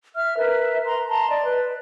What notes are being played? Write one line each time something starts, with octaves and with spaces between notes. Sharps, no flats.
E5 F6
A#4 B4 E5
A#5 C6
A5 A#5 C6
D5 D#5
B4